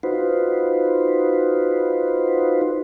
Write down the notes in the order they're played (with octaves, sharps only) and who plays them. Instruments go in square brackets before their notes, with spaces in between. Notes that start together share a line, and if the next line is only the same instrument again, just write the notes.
[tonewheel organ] D#4 F4 F#4 B4 C5